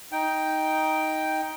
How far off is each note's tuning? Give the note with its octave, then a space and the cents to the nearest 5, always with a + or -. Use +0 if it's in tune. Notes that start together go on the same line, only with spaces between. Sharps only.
D#4 +10 G5 +0